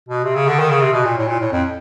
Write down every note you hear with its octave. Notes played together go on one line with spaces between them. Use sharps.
B2
C3
C#3
D3
D#3
C#3
C3
B2
A#2
A2
A#2
A2
F2